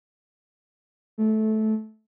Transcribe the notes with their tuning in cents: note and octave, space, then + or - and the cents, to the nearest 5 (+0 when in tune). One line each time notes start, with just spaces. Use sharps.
A3 -15